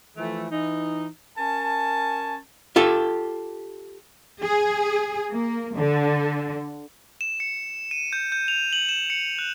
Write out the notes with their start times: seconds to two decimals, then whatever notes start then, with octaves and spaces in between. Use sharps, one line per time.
0.17 E3 F3 A3
0.51 E3 D#4
1.38 C#4 A#4 G#5 A5
2.76 F4 G4 A4
4.42 G#4
5.30 A#3
5.75 D3
7.21 E7
7.40 C#7
7.91 D#7
8.13 G6
8.32 G6
8.48 F7
8.73 F#7
8.89 E7
9.10 C#7
9.39 F#6